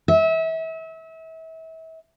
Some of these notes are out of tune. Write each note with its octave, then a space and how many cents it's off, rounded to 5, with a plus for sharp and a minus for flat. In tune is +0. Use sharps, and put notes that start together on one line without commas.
E5 -35